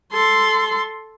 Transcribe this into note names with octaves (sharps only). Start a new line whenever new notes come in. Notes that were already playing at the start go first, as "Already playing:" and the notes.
A4 C6